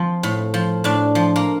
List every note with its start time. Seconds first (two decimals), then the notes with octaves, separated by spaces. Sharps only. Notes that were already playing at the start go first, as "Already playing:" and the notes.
Already playing: F3 C4
0.23 A2
0.54 F3
0.84 A2 D4
1.15 F3
1.36 A#3